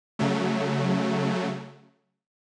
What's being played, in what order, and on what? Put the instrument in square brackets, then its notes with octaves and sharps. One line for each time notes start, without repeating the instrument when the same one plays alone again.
[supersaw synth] C#3 F#3 A3